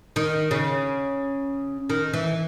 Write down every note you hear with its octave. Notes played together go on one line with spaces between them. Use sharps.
D#3
C#3
D#3
E3